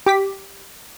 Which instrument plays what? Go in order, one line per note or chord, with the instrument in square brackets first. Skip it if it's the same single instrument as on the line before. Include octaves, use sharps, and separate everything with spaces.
[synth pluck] G4 D6 B6